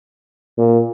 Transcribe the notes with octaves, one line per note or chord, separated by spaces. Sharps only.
A#2